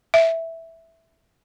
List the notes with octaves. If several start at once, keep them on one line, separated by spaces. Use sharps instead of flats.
E5